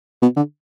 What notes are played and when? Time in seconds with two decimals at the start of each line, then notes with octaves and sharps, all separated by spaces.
0.22 B2
0.37 D3